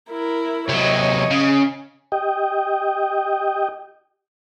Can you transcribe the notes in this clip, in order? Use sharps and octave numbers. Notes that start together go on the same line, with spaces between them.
E4 A#4
C3 F#3 C#5 D#5
C#3
G4 D#5 G5